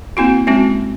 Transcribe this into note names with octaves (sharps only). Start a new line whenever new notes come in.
A#3 C4 E4 F#4
G#3 C4 C#4 F#4